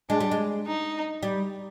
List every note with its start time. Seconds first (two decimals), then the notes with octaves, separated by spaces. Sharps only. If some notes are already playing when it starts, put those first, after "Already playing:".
0.10 G#3 D4
0.20 G3
0.32 G#3
0.66 D#4
1.23 G3